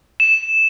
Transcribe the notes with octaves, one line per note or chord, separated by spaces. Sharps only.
E7